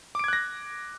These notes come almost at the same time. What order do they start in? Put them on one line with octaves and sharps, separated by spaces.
D6 D7 G#6 F#6 A#6